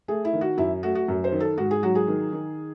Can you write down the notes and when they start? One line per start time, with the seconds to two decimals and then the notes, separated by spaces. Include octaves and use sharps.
0.08 A3 G#4
0.25 E4
0.33 D#3
0.41 F#4
0.58 F#2 E4
0.83 A3 F#4
0.95 F#4
1.08 F#2
1.24 C5
1.32 D#3
1.40 A4
1.57 G#2 F#4
1.71 G#4
1.83 F#3 F#4
1.95 G#4
2.07 D#3
2.33 D#3